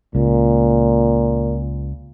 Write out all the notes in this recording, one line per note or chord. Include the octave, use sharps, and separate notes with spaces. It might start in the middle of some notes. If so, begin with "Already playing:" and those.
C#2 A#2